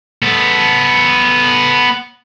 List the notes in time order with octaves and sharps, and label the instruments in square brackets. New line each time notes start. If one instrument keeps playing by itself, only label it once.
[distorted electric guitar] B3 A4